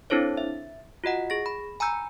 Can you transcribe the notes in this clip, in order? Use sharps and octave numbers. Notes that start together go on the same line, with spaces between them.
C4 D4 E4 A4 C5 C#5
E5
F4 F#4 D#5 F#5
G#4 A#6
B5
G#5 A#5 B5 E6 G6